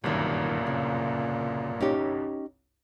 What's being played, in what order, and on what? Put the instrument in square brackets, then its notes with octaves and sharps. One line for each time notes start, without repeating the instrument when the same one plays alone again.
[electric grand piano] G1 C2 F#2 [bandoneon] A#2 [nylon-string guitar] D#3 G3
[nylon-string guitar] C#3
C#4 D#4 G4